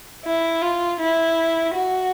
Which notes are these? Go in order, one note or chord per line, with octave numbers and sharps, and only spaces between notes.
E4
F4
E4
F#4